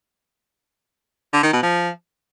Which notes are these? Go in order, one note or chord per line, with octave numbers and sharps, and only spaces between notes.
D3
D#3
B2
F3